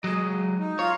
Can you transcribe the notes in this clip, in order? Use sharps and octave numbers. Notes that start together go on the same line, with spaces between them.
F#3 G#3 D#5
C#3
D#4
F4 C#5 F5 A#5